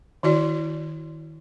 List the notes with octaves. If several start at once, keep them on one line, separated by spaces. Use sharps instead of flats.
D#3 E4 F#4 D5